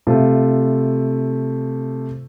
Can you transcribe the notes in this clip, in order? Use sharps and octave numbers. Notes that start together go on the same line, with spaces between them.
C3 A3 F4